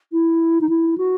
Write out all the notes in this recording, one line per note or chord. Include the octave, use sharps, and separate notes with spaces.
E4
D#4
E4
F#4